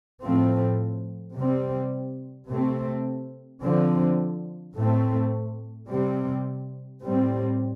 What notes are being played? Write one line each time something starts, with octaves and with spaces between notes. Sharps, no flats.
A2 F3 A3 C4
C3 G3 C4
C3 A3 C4
D3 F3 C4
A2 A3 C4
C3 G3 C4
A2 G3 C4